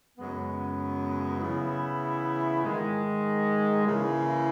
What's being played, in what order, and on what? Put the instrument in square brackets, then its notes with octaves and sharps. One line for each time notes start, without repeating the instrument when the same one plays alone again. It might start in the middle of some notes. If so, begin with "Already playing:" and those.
[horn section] F#2 C#3 G#3 B3
C#3 E3 B3 E4
G#2 D#3 G#3
C#3 E3 A#3 E4 G#4